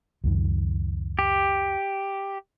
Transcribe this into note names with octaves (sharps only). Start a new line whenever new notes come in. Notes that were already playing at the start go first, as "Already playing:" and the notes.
C#2 F#2 D#3
G4